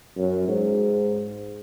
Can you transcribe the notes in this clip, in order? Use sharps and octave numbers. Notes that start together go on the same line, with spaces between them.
F#2
G#2